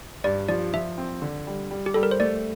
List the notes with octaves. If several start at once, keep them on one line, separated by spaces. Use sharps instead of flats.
G2 D5
F3 D5
F3 E5
C4
D3
G3
G3
G4
G3 A4
A#4
C5
A3 D5